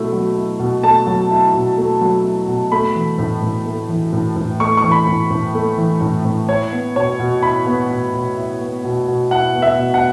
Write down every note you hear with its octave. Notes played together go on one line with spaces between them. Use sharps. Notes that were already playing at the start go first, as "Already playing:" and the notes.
Already playing: B2 F#3 A3 E4
F#3
E4
B2
A3 A5
F#3
E4
B2
A3
F#3
E4
B2
A3 B5
E3
A2
A2
A3
E3
A2
A2
A3 C#6
C#6
E3
B5
A2
A2
A3
E3
A2
A2
E4 C#5
B3
B2 C#5
B2
E4 B5
B3
B2
B2
E4
B3
B2
B2
E4 F#5
B3
E5
B2
F#5